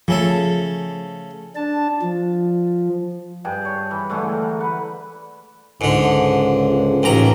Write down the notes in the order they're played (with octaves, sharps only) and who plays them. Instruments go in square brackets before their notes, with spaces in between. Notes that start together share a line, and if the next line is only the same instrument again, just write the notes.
[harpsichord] C#3 A3 A4 [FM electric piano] F3
[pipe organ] D4 A5
F3
[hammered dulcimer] G2 G#4 G5 A5
C#5
E3
D3 E3 G#3 A3
A#4
B4 F#5
[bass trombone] C#2 [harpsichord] G#2 D3
[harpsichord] A1 D#2 A#5